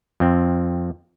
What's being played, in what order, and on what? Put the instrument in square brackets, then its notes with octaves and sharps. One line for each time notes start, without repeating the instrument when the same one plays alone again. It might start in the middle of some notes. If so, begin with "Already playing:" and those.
[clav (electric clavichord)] F2 C4